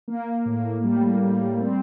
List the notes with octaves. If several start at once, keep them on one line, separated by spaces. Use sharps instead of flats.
A#3
A2
G3
G3
C4